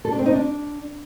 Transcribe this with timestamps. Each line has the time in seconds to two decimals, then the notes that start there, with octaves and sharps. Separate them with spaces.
0.05 A4
0.12 D4
0.19 C4
0.26 D#4
0.33 D4